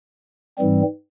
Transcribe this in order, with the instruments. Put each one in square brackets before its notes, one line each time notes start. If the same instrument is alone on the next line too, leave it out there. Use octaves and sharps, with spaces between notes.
[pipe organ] G#2 E3 G3 C4